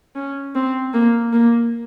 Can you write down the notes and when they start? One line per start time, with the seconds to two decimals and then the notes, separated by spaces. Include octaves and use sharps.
0.15 C#4
0.55 C4
0.94 A#3
1.33 A#3